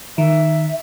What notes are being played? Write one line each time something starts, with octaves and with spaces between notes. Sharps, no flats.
D#3 E5